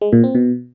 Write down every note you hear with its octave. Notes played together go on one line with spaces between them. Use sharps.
G#3
A#2
C4
B2